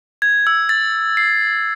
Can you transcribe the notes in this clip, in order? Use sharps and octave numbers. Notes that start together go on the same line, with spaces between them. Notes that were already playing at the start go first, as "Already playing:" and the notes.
G#6
E6
A6
C7